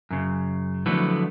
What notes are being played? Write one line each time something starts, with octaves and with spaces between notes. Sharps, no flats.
F#2 C#3
D3 F3 F#3 A3 B3 E4